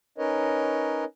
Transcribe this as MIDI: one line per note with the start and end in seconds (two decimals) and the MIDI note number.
0.18 1.05 61
0.18 1.05 63
0.18 1.05 70
0.18 1.05 71
0.18 1.05 73
0.18 1.05 75